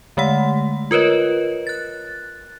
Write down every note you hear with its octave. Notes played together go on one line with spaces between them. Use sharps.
D3 G#3 A3 F#5
F4 A#4 B4 C#5 D#5
F#6 A6